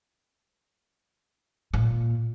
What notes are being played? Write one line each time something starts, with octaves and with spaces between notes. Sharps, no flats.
A#2